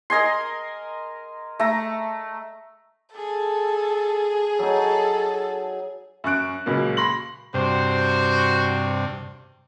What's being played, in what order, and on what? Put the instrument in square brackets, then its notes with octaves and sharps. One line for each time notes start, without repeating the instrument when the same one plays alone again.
[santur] A#4 D#5 G#5 C6
A3 A#5
[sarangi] G#4 [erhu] A4
[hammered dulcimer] F#3 D#4 [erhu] A4
[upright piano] F#2 C#6 F#6 D7
C#2 A#2 F#3 A#3
B5 C6 A#6 F#7
[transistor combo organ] G2 C3 [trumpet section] F#4 C5